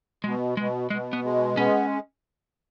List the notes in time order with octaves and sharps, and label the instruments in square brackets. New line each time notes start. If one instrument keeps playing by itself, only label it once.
[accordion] B2 [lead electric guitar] G#3
[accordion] B2 [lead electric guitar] G#3
[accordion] B2 [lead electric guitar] G#3
[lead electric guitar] B3
[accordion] G#3
[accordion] B3 [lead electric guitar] C#4